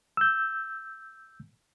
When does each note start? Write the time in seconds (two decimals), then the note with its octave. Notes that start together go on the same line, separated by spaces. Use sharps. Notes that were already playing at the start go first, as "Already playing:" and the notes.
0.17 E6 G6